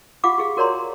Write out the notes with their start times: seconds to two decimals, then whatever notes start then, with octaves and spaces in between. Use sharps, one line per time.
0.24 F4 G4 F5 F#5 D6
0.38 G4 G#4 F5
0.57 F#4 A#4 C#5 D5 A#5 C6